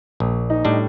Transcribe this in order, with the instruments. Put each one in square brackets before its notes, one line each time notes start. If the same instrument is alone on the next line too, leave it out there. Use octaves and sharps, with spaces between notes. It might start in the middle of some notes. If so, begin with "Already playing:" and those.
[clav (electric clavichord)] A#1
[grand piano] D#4
[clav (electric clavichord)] A2 G3 D4